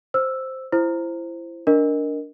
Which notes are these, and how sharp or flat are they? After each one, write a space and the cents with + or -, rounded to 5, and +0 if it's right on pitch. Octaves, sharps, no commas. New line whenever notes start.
C5 +0 E6 +0
E4 +30 C5 +0
D4 -10 A#4 +0 D#5 +0